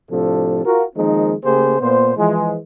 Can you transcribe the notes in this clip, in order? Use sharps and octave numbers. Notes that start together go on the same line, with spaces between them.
A2 C3 F3 D4 A4
F4 F#4 A#4
D#3 F3 G#3 A#3 C4 D#4
C#3 A3 A#3 G4 G#4 C5
A#2 B3 C5
E3 F3 G#3